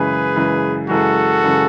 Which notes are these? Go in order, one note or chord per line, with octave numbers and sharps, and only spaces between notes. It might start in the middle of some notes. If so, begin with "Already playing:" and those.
Already playing: F#2 C#3 E3 G#3 G#4 B4
F#2 C#3 E3 G#3
F#2 C#3 E3 G#3 F#4 A4
F#2 C#3 E3 G#3